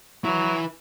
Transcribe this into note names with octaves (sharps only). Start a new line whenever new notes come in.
F#3 E4 B4